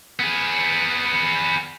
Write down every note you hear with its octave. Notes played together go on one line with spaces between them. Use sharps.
B3 G#4